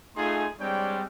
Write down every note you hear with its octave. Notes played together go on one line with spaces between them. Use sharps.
A3 D#4 F4 G#4 G#5 C6
G3 G#3 C4 D4 C#5 G5